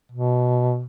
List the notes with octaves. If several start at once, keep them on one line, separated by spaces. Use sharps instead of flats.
B2